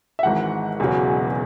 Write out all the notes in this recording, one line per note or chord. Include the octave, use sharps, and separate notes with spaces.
E5
G#1 G#2 E3 F#5
E1 E2 C#3 F#3